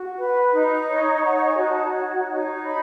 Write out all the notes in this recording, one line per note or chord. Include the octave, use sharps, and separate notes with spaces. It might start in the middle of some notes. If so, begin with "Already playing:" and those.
Already playing: F#4
B4
D#4
C#5
D#4 F#5
G#5
F#4
A5
C#5
D#4
C#5 B5